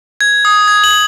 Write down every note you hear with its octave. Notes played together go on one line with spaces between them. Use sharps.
G#6
D#6
G#6
F#7